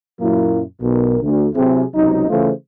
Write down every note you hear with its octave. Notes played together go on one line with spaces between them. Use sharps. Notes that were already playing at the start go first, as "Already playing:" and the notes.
F#2 A#2 F#3 A#3 E4
B1 B2 A#4
D2
C3 F#3 C4 E4 G#4
C#2 C3 F#3 D#4
C#3 E3 A3 F4 G#4 C5